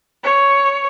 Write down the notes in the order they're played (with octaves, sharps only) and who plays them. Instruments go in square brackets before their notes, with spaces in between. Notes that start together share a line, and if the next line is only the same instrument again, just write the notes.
[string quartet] C#5